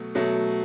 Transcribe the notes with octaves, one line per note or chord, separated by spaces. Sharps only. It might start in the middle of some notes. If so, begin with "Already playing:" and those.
Already playing: B2 F#3 A3
B2 F#3 A3